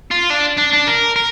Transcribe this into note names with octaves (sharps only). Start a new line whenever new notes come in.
F4
D4
D4
D4
A#4
A#4